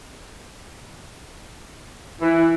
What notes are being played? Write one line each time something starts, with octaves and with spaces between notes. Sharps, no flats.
E3